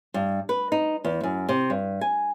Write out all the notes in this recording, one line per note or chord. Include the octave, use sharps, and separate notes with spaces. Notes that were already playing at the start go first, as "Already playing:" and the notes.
G2
B4
D#4
E2
F#2
C3
G2
G#5